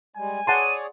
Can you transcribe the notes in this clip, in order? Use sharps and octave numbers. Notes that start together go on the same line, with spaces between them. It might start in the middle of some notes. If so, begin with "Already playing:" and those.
G3 G#3 G#5
G#4 C#5 D5 F#5 A5 C6 D#7